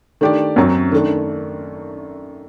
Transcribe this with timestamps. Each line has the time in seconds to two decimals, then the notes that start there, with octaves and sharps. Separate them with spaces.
0.21 D#3 A3 D4 G4 D5
0.56 F#2 F#3 C4
0.92 D#3 A3 D4